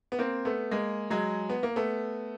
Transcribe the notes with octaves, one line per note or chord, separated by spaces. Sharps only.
B3
A#3 C4
A3 B3
G#3 A#3
F#3 G#3
B3
A#3
A3 B3